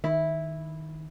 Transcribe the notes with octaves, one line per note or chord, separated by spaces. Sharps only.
D#3 E4